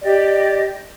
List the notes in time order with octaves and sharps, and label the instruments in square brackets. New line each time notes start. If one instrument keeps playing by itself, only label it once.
[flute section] G4 D5 D#5